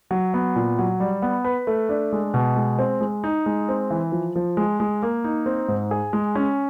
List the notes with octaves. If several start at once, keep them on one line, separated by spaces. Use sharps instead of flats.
F#3
B3
A#2
F#3
G3
B3
B4
A3
D4
G#3
B2
G#3
C4
G#3
D#4
G#3
C4
E3
F3
F3
G#3
G#3
A#3
D#4
C4
G#2
G#4
G#3
C#4